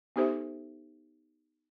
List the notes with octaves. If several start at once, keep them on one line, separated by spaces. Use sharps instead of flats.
B3 D#4 G4 A4 C5 E5